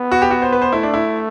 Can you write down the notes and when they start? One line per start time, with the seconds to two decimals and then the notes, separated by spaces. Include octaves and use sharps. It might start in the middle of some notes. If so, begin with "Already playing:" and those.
Already playing: B3
0.12 F#4
0.22 G4
0.31 F#4
0.42 C5
0.53 B4
0.62 C5
0.72 A3 E4
0.83 D4
0.94 E4